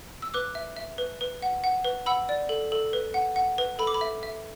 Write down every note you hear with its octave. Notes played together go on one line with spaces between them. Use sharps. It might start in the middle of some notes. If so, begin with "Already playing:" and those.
E6
B4 D6 F#6
E5
E5
B4
B4
F#5
F#5
B4
F#5 B5 E6
D5
A4
A4
B4
F#5
F#5
B4
A4 B5
D6
B5
E5
E5